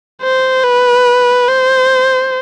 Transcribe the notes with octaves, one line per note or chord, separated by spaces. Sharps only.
C5
B4
C5